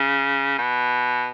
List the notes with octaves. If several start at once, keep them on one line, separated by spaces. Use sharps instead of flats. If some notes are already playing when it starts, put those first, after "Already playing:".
Already playing: C#3
B2